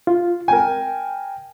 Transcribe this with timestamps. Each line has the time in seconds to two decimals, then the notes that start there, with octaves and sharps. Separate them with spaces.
0.07 F4
0.48 A#4 G5 G#5